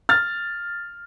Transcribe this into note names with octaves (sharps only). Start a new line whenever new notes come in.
F6 A6